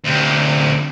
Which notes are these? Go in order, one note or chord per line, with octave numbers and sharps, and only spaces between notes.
D2 C3